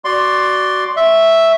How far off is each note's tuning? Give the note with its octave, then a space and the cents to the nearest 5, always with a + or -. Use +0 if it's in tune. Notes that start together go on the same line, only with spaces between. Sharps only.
F#4 +15 D5 +0 C6 +5
E5 +0 C#6 +0